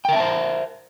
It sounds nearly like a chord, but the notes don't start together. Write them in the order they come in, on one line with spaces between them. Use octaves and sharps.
G5 A#4 E5 A5 C5